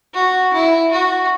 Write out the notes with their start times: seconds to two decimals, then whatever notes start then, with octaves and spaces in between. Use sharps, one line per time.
0.14 F#4
0.53 E4
0.92 F#4